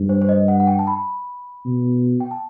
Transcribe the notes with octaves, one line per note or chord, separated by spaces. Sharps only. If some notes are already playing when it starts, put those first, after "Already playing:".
Already playing: G2
C5
C5
D#5
F#5
F#5
G5
A5
B5
B2
G5
A5